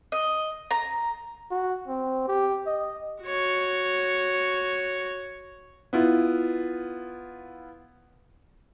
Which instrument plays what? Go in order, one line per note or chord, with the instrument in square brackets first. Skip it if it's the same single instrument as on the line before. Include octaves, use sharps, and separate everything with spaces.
[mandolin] D#5
A#5
[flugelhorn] F#4
C4
G4
D#5
[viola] F#4 C#5
[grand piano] B3 E4 F4